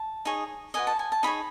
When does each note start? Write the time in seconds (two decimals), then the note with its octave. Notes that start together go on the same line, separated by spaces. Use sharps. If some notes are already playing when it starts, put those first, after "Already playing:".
Already playing: A5
0.25 D#4 G#4 C#5
0.74 F#4 B4 D#5 G#5
0.87 A5
0.99 G#5
1.12 A5
1.23 D#4 G#4 C#5 B5